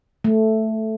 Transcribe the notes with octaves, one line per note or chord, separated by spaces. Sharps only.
A3